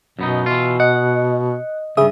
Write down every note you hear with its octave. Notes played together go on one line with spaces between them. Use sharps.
F#2 B2 B3 D#4
E3 F4
D#5 F#5
D2 G2 C#3 G#4 E5 D#6